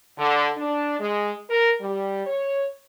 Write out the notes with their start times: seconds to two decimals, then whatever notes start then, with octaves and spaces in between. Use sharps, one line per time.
0.18 D3
0.57 D4
1.00 G#3
1.50 A#4
1.81 G3
2.26 C#5